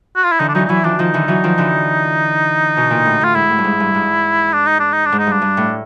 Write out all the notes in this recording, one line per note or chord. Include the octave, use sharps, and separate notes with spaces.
F#4
F4
E4
D3 E3 D#4
D4
E3 F#3 D#4
D#4
E3 F#3 E4
D#3 F3 D4
D#3 F3 D#4
D3 E3
E3 F#3
D#3 F3
D3 E3
B2
A#2
A2
A2 F4
G#2 E4
A2
G2
G#2
G2
G#2
D4
D#4
D4
D#4
D4
G#2
D#4
G2 D4
G2
A2